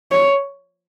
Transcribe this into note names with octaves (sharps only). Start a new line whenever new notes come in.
C#5